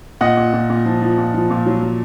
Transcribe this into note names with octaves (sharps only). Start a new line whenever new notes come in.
A#2 D#5 F#5
A#2
A#2
A#2
F3
F3
A#2
F3
A#2
F#3
F#3